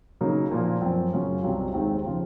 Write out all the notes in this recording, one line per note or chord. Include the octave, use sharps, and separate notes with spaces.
C#3 F#3 A#3 D#4
A#2 F3 A#3 F4
F#2 F3 C4
F#2 C#3 F#3 C#4 F4
C2 C3 F#3 C4 F4
D#2 D#3 G#3 C4
C#3 F3 C4 F4